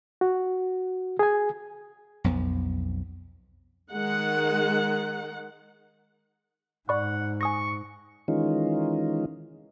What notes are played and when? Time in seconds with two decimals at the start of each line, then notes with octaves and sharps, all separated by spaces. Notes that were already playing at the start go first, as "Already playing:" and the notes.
0.21 F#4
1.19 G#4 G#5
2.24 B1 F2 B3
3.91 D#3 G#3 F#5
6.89 G#2 D5 F#5 B5 C#6
7.41 G#5 C#6 D#6 A#6
8.28 D#3 E3 G#3 C#4 D#4 F4